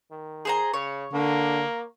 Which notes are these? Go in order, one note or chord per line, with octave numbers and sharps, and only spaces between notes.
D#3
G#4 C5 A#5
C#3 C#5
D3 A#3